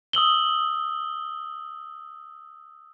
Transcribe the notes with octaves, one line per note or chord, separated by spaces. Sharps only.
D#6 E6 F#7 G7